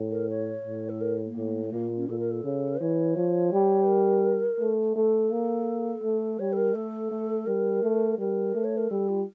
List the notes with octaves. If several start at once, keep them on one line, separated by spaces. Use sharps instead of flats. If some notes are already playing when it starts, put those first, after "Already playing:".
Already playing: A2
A#4
C#5
A2
A4
A#4
A#3
A2
A3
A#2 A#3
C#4
A#2 A4
A#4
A4
C#3
E3 C#5
F3
G3
A#4
A3
A3 A4
A#3
A3
G3 C#5
A4
A#4
A3 A4
A3
G3 A#4
A3
G3 A#4
A3
C#5
A#4
G3 A4
F4